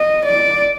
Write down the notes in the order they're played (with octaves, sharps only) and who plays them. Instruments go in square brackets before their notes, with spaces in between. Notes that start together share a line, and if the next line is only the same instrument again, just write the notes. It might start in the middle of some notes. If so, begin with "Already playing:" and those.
Already playing: [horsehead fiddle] D#5
D5